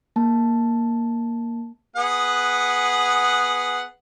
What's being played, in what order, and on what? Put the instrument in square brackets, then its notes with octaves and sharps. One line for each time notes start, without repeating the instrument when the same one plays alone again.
[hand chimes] A#3 A5
[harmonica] B3 G#4 F#5